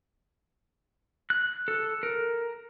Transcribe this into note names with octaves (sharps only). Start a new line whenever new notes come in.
F#6
A4
A#4